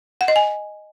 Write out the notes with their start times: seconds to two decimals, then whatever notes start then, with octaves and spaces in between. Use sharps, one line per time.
0.21 F#5
0.28 D#5
0.36 G#5